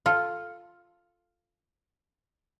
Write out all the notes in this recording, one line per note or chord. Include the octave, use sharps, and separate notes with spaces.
F4 A4